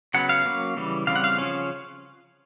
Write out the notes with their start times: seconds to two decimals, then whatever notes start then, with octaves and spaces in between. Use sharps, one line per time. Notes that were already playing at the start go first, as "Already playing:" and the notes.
0.14 C#3 F#3 B3 F#5
0.29 F5
0.46 F#3 A#3 C#4
0.77 C#3 E3 G3
1.07 C#3 E3 G3 C4 F5
1.16 F#5
1.24 F5
1.38 C#3 F3 A#3 C#4